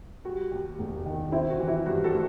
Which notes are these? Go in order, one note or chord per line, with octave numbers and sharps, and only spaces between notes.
G3 F#4
D#2
E1
D#3
C4 E4
F#4
E3
E4
G2 F#4
F#4 A4
A3